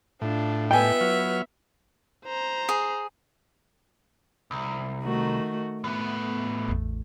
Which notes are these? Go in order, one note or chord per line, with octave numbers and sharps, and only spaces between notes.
A2 D4 F4
B3 F4 B4 E5 G5 G#5
F#3 F6
C5 A#5
G#4
C2
D#3 A3 F#4
A2 A3 B3
A1 E2